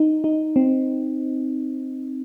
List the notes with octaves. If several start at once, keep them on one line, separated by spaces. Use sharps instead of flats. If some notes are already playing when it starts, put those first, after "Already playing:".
Already playing: D#4
D#4
C4